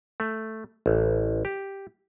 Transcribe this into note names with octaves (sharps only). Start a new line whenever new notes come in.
A3
A1
G4